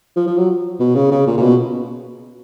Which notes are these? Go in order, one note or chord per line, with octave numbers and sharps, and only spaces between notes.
F3
F3
F#3
B2
C#3
C#3
A#2
A#2
B2